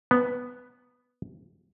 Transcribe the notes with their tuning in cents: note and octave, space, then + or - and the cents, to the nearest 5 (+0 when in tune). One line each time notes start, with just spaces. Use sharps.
B3 +0